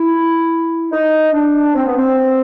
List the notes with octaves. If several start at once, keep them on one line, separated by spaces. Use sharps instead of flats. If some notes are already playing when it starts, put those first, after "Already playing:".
Already playing: E4
D#4
D4
C4
B3
C4